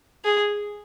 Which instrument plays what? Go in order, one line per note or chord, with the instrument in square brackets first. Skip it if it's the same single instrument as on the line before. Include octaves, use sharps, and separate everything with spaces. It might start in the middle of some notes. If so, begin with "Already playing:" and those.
[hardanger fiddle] G#4